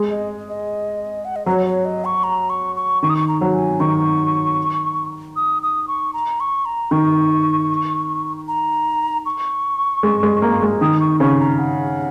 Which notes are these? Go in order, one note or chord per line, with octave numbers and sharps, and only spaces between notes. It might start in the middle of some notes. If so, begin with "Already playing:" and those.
Already playing: G#3
D#5
D#5
F#5
D#5
F#3 C#5
C#5
D#5
C#6
A#5
C#6
C#6
D#3 C#6
D#6
C#6
A#5
F#3
G#5
D#3 C#6
D#6
D#6
C#6
A#5
C#6
A#5
D#3 C#6
A#5
C#6
G#3
G#3
A#3
G#3
D#3 D#6
C#6
C#3 C#6
A#5
F#5